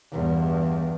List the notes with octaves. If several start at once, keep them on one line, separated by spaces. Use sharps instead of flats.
E2 G2